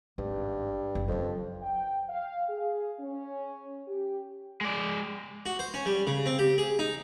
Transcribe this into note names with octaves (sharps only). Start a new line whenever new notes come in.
G#1 G2
F#1 E3
F2 F#3 C#4
G5
F5
G#4
C#4
G4
G#3 D5
F#4
C5
C#4
G3
C#3
C4
G4
G#4
D#4